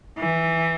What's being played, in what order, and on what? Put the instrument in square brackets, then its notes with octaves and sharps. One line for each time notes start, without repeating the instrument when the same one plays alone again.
[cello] E3